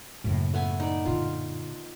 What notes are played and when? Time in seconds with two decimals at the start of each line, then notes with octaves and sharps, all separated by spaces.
0.24 F#2 A2 C#3 A#3
0.54 A3 B3 G#5
0.80 D#4 D5
1.05 A#2 D3 F4